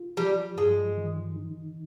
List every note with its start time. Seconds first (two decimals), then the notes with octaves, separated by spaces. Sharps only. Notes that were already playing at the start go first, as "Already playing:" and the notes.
Already playing: F4
0.17 F3 G3
0.56 G2 G#3
0.97 D#3
1.36 D#4